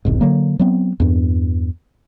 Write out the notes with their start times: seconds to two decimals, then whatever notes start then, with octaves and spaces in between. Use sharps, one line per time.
0.05 E1 C2 G#2
0.21 D3 F#3 A#3
0.59 F#3 B3 C4
1.00 E2 G2